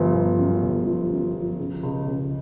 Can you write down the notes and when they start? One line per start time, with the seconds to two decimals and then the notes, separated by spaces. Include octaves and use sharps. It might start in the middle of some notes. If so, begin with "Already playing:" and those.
Already playing: G1 F3
0.14 G1
0.38 F#2
0.62 G1
0.86 F3
1.11 F#2
1.34 F3
1.59 C#3
1.83 C#2
2.07 C#2